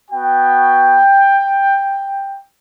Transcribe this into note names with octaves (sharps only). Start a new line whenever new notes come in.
B3 F#4 G5